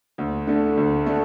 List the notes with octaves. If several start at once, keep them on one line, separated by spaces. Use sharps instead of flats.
D2
D3 A3
D2
D3 A3